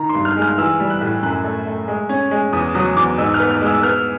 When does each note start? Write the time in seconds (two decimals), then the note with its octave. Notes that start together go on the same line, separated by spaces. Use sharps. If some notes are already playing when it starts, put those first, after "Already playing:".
Already playing: D#3 A#5
0.09 C6
0.15 G2
0.25 F6
0.36 G#3
0.42 F6
0.58 E3 E6
0.80 G3
0.90 F#6
1.01 A2
1.23 F#2 F#6
1.44 A3
1.67 A3
1.88 G#3
2.09 C#4
2.31 G#3
2.53 E2 D#6
2.75 F#3 D#6
2.96 E2 D6
3.18 G#2 E6
3.34 F6
3.40 B3
3.51 F6
3.61 G#3
3.67 E6
3.83 B3 F6